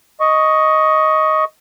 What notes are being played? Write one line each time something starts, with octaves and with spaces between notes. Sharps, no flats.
D#5 C#6